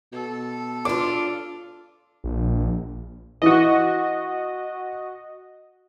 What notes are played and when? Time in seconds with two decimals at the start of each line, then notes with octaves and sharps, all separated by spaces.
0.12 B2 A4
0.85 D4 F4 D6
2.24 A#1
3.42 E3 F#4 D#5